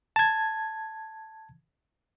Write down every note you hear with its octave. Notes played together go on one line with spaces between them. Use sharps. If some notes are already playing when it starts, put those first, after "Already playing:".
A5 G#6